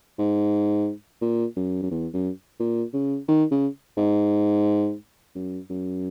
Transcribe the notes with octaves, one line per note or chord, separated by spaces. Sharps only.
G#2
A#2
F#2
F#2
E2
F#2
A#2
C#3
D#3
C#3
G#2
F#2
F#2